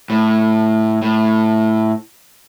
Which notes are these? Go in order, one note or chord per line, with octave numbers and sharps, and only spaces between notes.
A2
A2